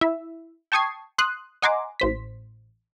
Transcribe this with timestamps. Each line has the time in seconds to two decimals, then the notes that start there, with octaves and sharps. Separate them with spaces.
0.01 E4 E5
0.72 G5 A5 C#6 D#6 G#6 C7
1.18 C6 D#6 F#6
1.62 D#5 F#5 G#5 A#5 C6 D6
2.00 A1 C5 B6